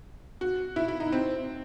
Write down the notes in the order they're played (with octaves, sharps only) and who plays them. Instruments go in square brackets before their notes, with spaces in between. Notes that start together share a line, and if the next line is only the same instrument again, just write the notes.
[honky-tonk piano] F#4
E4
E4
D#4
C4